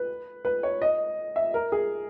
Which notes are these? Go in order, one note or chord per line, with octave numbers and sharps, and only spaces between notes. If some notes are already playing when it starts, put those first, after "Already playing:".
Already playing: B4
B4
C#5
D#5
E5
A#4
G#4